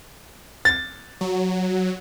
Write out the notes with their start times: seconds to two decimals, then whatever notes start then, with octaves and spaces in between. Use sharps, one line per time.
0.65 A6
1.21 F#3